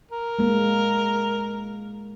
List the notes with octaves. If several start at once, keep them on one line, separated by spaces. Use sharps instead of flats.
A#4
G#3 A#3